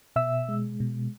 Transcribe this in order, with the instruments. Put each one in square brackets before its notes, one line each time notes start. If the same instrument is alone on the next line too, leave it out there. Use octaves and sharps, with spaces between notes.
[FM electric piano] B2 E5 E6
G#3
B2